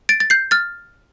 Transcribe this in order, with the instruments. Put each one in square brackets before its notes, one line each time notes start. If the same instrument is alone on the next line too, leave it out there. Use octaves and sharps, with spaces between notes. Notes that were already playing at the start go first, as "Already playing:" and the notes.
[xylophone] A6 D7
A6
G6 C7
F6 A6